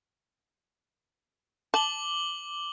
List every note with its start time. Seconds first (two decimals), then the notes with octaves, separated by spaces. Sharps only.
1.74 A5 D6 F#7 G7